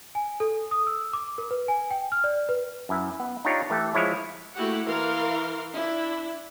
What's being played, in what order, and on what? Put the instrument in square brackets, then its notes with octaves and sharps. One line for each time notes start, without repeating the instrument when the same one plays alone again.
[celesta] G#5
A4
D#6
E6
D6
A#4
B4
G#5
G5
F6
D5
B4
[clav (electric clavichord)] F#2 E4
B3
D4 D#4 F4 G4 C#5
E3 A3 G4 A4
F3 G#3 E4 C#5
[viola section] A3 A#3 E4 F#4 G4 F#5
E3 A#4 F5 C6
D4 E4